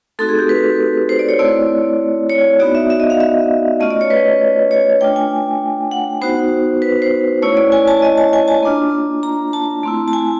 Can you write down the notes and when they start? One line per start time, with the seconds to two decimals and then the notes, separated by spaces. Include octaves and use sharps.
0.19 A3 C4 D#4 F#4 A4
0.29 G#4
0.39 G4
0.49 B4
1.09 C5
1.19 D5
1.29 C#5
1.39 A3 C4 E4 D5
2.29 C#5
2.60 B3 D#4 F#4 D5
2.75 E5
2.90 E5
3.00 D#5
3.10 F5
3.20 E5
3.80 A3 C#4 F4 D#5
3.90 D5
4.01 C#5
4.10 B4
4.71 C#5
5.01 A3 D4 F4 G5
5.16 G#5
5.91 F#5
6.21 B3 D#4 F#4 C5
6.82 B4
7.02 C5
7.42 A3 C#4 E4 C#5
7.57 D5
7.72 G#5
7.88 A5
8.02 D#5
8.18 A5
8.33 G#5
8.48 A5
8.63 A#3 D4 F4
9.23 A#5
9.53 A5
9.83 A3 C4 E4
10.08 A5
10.13 G#5